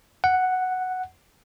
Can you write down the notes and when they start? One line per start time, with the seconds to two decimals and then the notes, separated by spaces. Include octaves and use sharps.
0.24 F#5